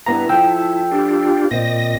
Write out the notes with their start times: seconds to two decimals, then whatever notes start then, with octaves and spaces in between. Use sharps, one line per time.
0.06 G2 B3 E4 A#5
0.29 F3 A4 G5 E6
0.91 D4 F4 G4
1.51 A#2 C4 D5 D#5 A#6